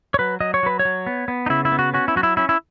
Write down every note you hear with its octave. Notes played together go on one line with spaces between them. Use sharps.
C#5
F#3 B4
F#3 D#5
C#5
F#3 B4
C#5
F#3
B3
B3
D#4
C#3 E4
E4
B3
F#4
C#4 F#4
E4
F#3 F#4
E4
C#4 E4
E4